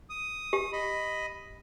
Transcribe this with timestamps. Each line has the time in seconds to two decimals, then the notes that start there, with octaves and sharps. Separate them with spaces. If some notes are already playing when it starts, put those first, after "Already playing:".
0.10 D#6
0.53 G4
0.73 D#5 B5